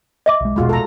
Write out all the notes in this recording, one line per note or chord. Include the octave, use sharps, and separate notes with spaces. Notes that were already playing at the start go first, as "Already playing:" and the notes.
D#5 E5 D6
B1 G#3
E1 A#1 B2 G#3 F4 F#4
A4 A#5